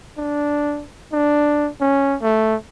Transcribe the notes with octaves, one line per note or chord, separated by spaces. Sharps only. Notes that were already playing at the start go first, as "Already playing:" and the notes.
D4
D4
C#4
A3